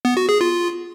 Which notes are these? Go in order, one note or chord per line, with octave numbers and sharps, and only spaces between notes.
B3
F#4
G#4
F4